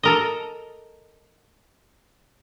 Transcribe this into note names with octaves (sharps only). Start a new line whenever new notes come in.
A4 A#4 D#5